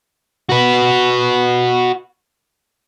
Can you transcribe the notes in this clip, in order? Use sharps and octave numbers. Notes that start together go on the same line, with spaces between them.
F#4 B4